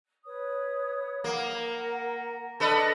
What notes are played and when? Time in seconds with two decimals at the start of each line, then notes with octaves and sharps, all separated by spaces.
0.26 B4 C#5 D#6
1.24 A#3 A#4 F#5
2.60 D4 A4 B4 D#5